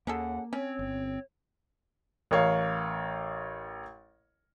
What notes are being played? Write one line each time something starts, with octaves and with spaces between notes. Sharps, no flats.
D#2 A#3 C#4 G#4 A4 F#5
C4 C#4 C#5
G1
A1 A#4 C#5 F5